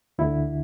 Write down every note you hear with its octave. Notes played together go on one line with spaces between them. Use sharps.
D2 D3 E4